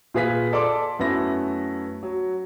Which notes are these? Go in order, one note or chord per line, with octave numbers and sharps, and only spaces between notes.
A#2 F4 G#4 B4 F5 B6
A4 D5 A5 C6 D6
F#2 A3 B3 E4 A#6
F#3